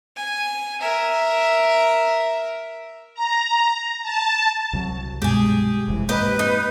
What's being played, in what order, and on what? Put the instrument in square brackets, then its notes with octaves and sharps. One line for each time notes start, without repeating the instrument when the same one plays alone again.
[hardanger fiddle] G#5
A#4 E5
[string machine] A#5
A5
[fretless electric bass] C2 F#3
[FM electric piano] G2 B2 G#3 [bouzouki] G4 G#4
[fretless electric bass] F1 C2 E3
[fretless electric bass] G#2 A#3 [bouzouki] G4 D#5 [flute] B4
[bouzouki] D#4